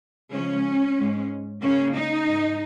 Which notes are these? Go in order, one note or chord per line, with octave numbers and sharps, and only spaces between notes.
C#3 F3 G#3 C#4
G#2 G#3
C#3 A#3 C#4
D#4
G#2 G#3